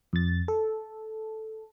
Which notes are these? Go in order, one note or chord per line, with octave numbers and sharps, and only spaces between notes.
F2 A6
A4